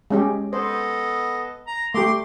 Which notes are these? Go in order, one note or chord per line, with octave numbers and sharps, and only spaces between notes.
G#3 C#4 G4
B3 A4 C5 D#5
A#5
A3 G4 C6 D6